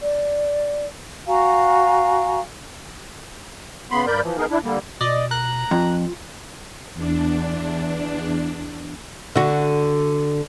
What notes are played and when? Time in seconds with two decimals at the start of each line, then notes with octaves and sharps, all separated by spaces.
0.01 D5
1.27 F#4 F5 G#5 A#5
3.91 C#3 B3 B5 C6
4.07 G2 A#4 D5 B5 G6
4.21 E3 F3
4.37 B3 D#4 G#4 A#4
4.50 D4 E4
4.64 D3 G3 A#3
5.01 B2 D5 D#5
5.31 A#5 F#6
5.71 F2 F4
6.94 E2 D4
9.36 D3 F#4